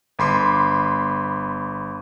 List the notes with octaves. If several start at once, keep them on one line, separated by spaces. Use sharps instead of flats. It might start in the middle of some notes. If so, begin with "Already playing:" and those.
G1 B5 C6 D6